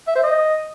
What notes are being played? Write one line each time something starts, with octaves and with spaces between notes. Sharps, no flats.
E5
C5
D#5